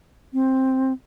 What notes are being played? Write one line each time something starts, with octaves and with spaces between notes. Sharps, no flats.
C4